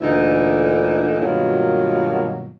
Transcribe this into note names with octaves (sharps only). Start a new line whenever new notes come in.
D2 A#2 D3 E3 D#4 E4
G2 B2 D#3 F#3 A#3 F4